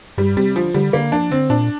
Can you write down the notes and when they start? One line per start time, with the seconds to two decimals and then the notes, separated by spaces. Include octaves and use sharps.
0.18 G2 G3
0.37 C3 G3
0.55 D3 F3
0.74 D3 G3
0.93 D3 A#3
1.12 F3 D4
1.31 D3 C4
1.50 A#2 D4